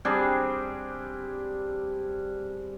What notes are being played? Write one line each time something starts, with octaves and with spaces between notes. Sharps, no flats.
G3 C4 D4 G#4